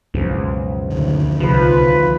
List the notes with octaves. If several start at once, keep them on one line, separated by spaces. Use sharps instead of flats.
C#2 F#2 B2 F3
D2 D3 D#3
C2 C3 F3 F4 B4